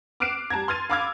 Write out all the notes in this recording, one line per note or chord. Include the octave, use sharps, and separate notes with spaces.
D6 F6 F#6 C7 D7 E7
G3 A5 A#5 G#6
C6 F6 G#6 A6 D#7
F5 B5 D6 E6 F6 G#6